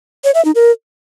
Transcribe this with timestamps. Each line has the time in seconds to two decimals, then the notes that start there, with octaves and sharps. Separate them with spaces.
0.24 C#5
0.34 E5
0.45 D#4
0.55 A#4